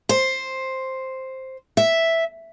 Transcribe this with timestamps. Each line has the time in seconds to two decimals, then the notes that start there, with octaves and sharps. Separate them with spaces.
0.09 C5
1.77 E5